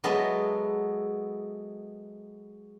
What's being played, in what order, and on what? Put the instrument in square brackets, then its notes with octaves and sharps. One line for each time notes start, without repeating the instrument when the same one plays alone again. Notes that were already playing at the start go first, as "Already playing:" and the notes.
[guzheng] F#3 G#3 B3 A4 D#5 E5